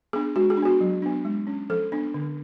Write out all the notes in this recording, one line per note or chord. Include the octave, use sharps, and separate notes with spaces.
B3 D4 G#4
G#3 F#4
G#4
D4
B3 F#4
F#3
B3 D4
G#3
C#4
F3 A4
B3 D4
D3